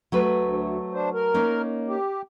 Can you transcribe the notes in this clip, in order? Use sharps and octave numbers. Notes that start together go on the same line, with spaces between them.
F#3 A3 B4
D2
D4 C5
A#4
A#3 C#4 D#4
G4